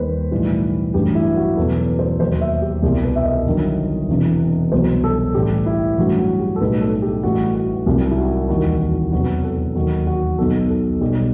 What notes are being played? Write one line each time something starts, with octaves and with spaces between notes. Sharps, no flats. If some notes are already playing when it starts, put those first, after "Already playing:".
Already playing: D#2 D#3 G3 B4 C5
B1 A2 E3 G3
A1 G2 F#3 G4
E4
F#4
E2 B2 F#3 A4
B4
C5
D#2 D#3 F#3 C5
E5
G4
C2 B2 G3 G4
B4
E5
D#5
G1 G2 D#3 F#3
E1 E2 C3 E3
C2 B2 F#3 C5
A4
A1 A2 G3 G4
E4
A1 G2 F#3 F#4
F#4
G4
A4
B1 A2 G3 B4
A4
G4
A1 A2 E3 G3 F#4
F#4
C2 C3 F#3 G4
E4
F#4
E1 D#2 D#3 G3 F#4
F#4
E1 E2 C3 F#3 F#4
A4
D#2 D#3 F#3 F#4
F#4
B1 B2 F#3 A4
A4
B1 B2 G3 G4